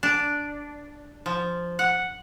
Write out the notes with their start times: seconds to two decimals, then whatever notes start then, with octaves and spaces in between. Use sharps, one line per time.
0.03 D4
1.26 F3
1.79 F#5